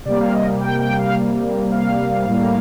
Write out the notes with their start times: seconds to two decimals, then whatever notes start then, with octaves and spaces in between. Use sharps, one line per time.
0.05 C3 G3 A#3 D5
0.20 F5
0.34 D#5
0.61 G5
0.80 G5
0.99 F5
1.72 F5
2.27 A2 G3 A#3